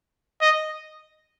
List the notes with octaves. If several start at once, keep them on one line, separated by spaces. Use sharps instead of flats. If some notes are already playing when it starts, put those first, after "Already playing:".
D#5